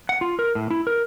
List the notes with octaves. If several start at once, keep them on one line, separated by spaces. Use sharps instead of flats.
F#5
F4
A#4
A2
E4
A#4